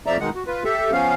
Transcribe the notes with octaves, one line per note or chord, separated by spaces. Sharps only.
F2 F3 D5 E5 A#5
B2 D#3 G#3 D#4 F#5
F#4
F4 B4
G4 A4 E5
F3 B3 C#4 F5